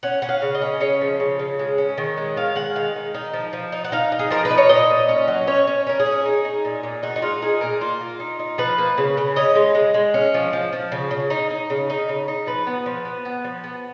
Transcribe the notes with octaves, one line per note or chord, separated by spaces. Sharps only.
C#4 F#5
C#4 F#5
F5
C#3
D#5
C#4
C#3 C#5
F3
C#3
C#3
G#3
C#4
D#3
G#3
D#3 F5
G#3 F#5
D#3 F5
D#3
D#4
F3
F3
D#4
F#5
D#4 F5
D#4
G#4
F3 A#4
B4
D#4
C#5
A#2 D#5
A#2
C#4
F#3
C#4 C#5
C#4
C#4 A#4
G#4
C#4
D#4
D#4
A#2
A#2
D#4 F#4
D#4
G#3 F4
D#4 G#4
A#2 A#4
A#3 F4
A#3
D#4
D#4
F3 B4
A#3
C#3
C#3
C#4 D#5
G#3
G#3
G#3
C#4
F3
F3
F3
C#3
C#3
D#4
D#4
C#3
D#4
C#3
D#4
F3 B4
B3
F3
B3
B3
F3
B3